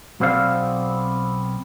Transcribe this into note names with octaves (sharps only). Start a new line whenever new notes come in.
B1 B2 B3 C4 D5 F5